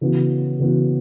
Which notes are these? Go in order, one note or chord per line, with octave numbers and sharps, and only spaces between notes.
C#3 E3 B3 F#4
C#3 E3 B3 F#4